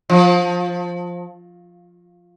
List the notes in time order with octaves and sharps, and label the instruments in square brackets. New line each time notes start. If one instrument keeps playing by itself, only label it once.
[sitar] F3